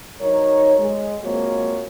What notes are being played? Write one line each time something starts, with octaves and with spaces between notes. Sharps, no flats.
F#3 D#4 A#4 C#5
G#3
F3 G#3 A#3 C4 F#4 C#5